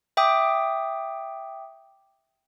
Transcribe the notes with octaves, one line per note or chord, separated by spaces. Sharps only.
E5 G5 D6 D#6